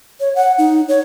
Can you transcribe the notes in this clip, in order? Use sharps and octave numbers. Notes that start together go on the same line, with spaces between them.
C#5
F#5
D#4
C#5